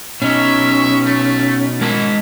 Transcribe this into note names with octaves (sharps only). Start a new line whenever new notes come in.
B2 C#4 D#4 E5
A3
G#3 E4 A#4